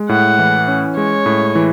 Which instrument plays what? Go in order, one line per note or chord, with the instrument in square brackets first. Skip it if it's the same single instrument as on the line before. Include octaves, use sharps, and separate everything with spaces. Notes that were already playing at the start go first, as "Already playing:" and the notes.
Already playing: [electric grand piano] G#3
[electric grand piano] A2 [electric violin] F#5
[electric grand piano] E3
C#4
[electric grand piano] G#3 [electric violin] C#5
[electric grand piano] A2
E3